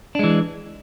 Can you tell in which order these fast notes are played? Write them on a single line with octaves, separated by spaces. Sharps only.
D4 G#3 E3